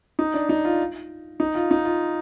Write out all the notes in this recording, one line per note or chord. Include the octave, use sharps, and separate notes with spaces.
D#4
D4
D#4
F4
D#4
F4
D#4
F4